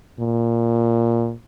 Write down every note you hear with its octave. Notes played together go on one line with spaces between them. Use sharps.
A#2